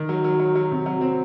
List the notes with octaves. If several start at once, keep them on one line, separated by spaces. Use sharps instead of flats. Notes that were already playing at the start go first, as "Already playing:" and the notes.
Already playing: D#3
F#3
F#3
F#3
F#3
C3
F#3
C4